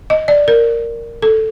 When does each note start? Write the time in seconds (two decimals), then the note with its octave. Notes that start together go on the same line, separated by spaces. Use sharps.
0.10 D#5
0.28 D5
0.48 A#4
1.22 A4